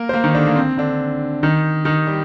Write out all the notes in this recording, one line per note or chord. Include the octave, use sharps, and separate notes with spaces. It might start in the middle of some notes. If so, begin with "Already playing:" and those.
Already playing: A#3 A#4
C5
A#3 A#4
D#3 D#4
D3 D4
A#3
C4
D3 D4
D#3 D#4
D#3 D#4
G3 G4